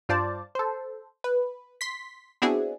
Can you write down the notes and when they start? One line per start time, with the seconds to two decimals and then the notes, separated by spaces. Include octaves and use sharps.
0.09 G2 F4 C5 D5 A5
0.55 A4 C5
1.24 B4
1.81 C6 B6
2.42 B3 C4 D4 E4 F#4 G#4